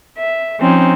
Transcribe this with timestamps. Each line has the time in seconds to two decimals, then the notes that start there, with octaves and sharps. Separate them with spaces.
0.19 E5
0.60 F3 C4 C#4 D#4